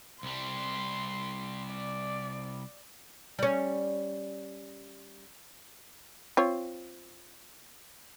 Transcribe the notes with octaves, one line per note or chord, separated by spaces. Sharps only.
C2 G3 C6
D5
G3 C#4
C4 F4 C#5